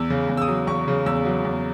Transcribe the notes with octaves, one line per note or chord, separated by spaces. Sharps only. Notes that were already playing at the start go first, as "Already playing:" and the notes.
Already playing: E2 E6
C#3
E2
E6
D#6
F#3
E2 C#6
C#3
E2 E6
F#3
E2